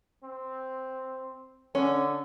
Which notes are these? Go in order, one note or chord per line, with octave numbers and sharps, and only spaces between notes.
C4
D3 C#4